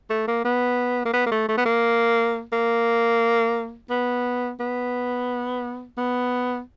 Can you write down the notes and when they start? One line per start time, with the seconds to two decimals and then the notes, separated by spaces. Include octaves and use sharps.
0.10 A3
0.28 A#3
0.45 B3
1.05 A#3
1.14 B3
1.26 A#3
1.32 A3
1.49 A3
1.58 B3
1.66 A#3
2.53 A#3
3.90 B3
4.60 B3
5.98 B3